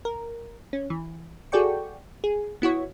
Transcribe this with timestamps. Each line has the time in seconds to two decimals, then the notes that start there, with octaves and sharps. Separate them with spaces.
0.05 A#4
0.73 C#4
0.90 E3
1.52 F#4 G#4 A4 D5 G5 C#6
2.24 G#4
2.62 B3 E4 F#4 C#5